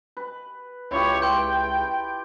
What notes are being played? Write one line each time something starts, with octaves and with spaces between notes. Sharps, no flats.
B4
C#2 E4 F4 G4 C#5
G5 C6 G6